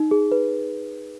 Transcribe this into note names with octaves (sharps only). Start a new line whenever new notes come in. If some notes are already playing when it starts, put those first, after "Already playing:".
Already playing: D#4
G#4
B4